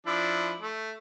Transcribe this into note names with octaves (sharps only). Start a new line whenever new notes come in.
F3 D4 E4
A3